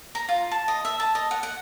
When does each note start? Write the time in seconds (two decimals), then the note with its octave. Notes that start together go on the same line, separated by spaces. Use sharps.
0.15 A#5
0.29 F4
0.52 A5
0.68 D#5
0.85 E5
1.00 A5
1.15 D#5
1.31 F#5
1.43 F#5